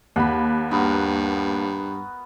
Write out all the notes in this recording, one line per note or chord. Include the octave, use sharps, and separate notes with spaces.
D#2 F#5 B5
G2 B3 F#4 A#4